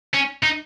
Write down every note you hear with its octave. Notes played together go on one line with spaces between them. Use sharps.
C#4
D#4